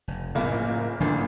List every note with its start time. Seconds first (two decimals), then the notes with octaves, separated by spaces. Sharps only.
0.08 F1
0.35 F#1 C#2 A2 C3 A#3
1.00 A1 A#2 D3 F3 D4